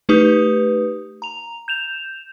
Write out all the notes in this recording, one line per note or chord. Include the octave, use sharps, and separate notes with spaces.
A3 D#4 G4 B4 D#6
A#5 F7
G6 E7 F7